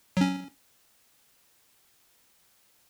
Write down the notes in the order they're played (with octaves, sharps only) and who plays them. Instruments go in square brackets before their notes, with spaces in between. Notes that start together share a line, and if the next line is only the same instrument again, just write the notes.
[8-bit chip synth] F#3 C#4